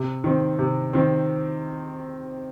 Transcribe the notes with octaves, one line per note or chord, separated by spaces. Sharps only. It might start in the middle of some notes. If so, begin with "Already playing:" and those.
Already playing: C3
D#3 C4
C3
D#3 C4